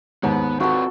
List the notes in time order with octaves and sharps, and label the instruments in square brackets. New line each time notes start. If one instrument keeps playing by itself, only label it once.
[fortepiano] D#2 G#2 [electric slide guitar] B3
[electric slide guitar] C4 F4 B4 [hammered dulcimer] F#4 A4